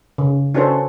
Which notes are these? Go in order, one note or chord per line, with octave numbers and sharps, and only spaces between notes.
C#3
C#4 D4 F#4 A4 B4 C5